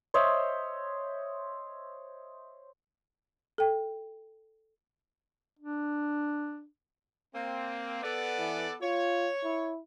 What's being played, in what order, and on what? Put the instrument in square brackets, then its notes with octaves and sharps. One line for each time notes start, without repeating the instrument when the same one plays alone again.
[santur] C5 C#5 D#5 E5
[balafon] A4 G5
[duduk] D4
[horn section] A#3 C4
B3 A4 D5
[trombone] E3
[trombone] F4 [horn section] C#5
[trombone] E4